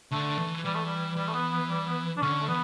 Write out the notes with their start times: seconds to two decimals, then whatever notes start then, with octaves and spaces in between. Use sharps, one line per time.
0.11 D3 A3
0.37 E3
0.64 E3 G3
0.75 A3
0.86 G3
1.17 E3 G3
1.28 A3
1.34 B3
1.52 B3
1.70 G3
1.87 B3
2.17 D4
2.22 D3 C#4
2.42 A3
2.48 E3 B3